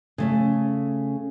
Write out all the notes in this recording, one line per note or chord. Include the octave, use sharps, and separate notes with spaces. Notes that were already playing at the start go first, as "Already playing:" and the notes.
C#3 A3 C#4